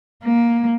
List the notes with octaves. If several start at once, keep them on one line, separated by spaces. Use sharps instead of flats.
A#3